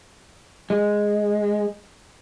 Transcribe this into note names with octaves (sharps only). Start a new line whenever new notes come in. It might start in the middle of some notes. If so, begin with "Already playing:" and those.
G#3